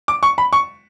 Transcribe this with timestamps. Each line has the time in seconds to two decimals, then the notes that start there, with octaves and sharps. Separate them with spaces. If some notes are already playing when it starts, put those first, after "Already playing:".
0.08 D6
0.23 C#6
0.38 B5
0.53 C#6